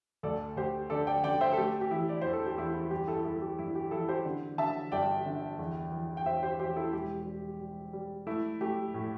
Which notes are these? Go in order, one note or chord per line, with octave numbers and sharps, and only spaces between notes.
D2 A4 D5
D2 G4 C5
D3 A4 D5
D5 G5
D3 D5 G5
C5 E5
A4
A3 G4
G4
E3 E4
D5
E2 C5
A4
G4
E2 E4
E4
G1 G4
E4 A4
G1 E4 A4
G4
G2 E4
G4
E3 E4 A4
G4 C5
D3
D3 E5 A5
G1 D5 G5
D3
E2
E3
G5
E2 C5 E5
G4 C5
E2 G4 C5
E4 A4
E1 G4
G3
G3
G3
A3 E4
A3 G4
A2